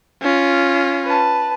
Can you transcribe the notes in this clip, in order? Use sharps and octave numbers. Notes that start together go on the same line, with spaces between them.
C#4 F4
B4 A5